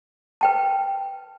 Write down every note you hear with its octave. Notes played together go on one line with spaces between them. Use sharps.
B4 G5 A5